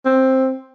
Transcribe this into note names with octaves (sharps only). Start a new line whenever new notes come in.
C4